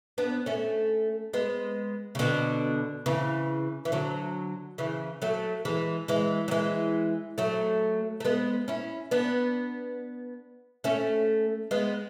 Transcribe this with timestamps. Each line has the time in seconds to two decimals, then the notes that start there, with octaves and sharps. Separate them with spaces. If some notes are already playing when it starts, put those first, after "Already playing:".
0.18 B3 D4
0.46 A3 C#4
1.33 G#3 B3
2.15 C#3
2.19 B2 D3
3.06 C#3 E3
3.85 E3
3.92 D3 F#3
4.78 C#3 E3
5.22 F#3 A3
5.65 E3 G#3
6.08 E3 G#3
6.48 F#3
6.51 E3 G#3
7.38 F#3 A3
8.20 A3
8.25 G#3 B3
8.68 C#4 E4
9.11 B3 D4
10.84 A3 C#4
11.71 G#3 B3